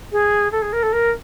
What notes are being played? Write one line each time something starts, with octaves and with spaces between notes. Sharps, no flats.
G#4
A4
G#4
A#4
A4
A#4